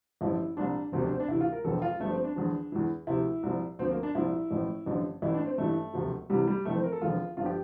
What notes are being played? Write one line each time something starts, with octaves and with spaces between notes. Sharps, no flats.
A1 G2 D3 F3 E4
C2 A#2 F3 D4
E1 D2 C3 F3 C4
D4
C4
D4
D2 C3 E3 E4
F4
A#4
E1 E2 D3 F3 A4
F4
G1 G2 F3 A3
C4
D4
E2 D3 F3
E2 E3
D2 C3 F3 E4
C2 A#2 F3
D2 D3 F3 C4
A#3
D4
C2 A#2 F3 E4
A1 A2 F3
A1 G2 D3 F3
A1 A2 E3 E4
D4
C4
A1 G2 E3 A3
E1 D2 C3 F3
C2 C3 E3 G3
G3
F1 F2 E3 A3
C4
A#4
A4
F1 E2 D3 F3 F4
G1 G2 F3 F4
G4